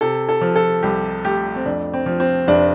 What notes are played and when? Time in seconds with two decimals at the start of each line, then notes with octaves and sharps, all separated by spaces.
0.01 C3 A4
0.29 A4
0.41 F3
0.56 A4
0.83 C2 G4
1.24 A3 G4
1.56 C4
1.65 F2 D4
1.93 C4
2.06 F3
2.20 C4
2.48 F1 D4